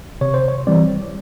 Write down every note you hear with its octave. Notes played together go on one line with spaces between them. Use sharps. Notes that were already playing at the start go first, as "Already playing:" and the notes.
C3 C#5
C5
C#5
E3 G3 C4 D5